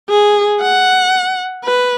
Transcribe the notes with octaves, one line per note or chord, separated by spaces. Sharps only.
G#4
F#5
B4